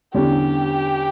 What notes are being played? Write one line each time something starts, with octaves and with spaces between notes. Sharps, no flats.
E2 D3 G3 C#4 G4